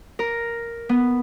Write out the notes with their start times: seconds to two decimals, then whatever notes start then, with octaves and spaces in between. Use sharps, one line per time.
0.19 A#4
0.89 B3